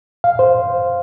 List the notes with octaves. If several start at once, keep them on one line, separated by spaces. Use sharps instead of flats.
F5
C5